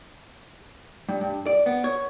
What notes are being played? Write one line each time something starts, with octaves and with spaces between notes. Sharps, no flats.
G2
G2
D5
B3
C#5